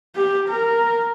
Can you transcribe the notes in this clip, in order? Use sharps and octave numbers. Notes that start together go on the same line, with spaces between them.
G4
A#4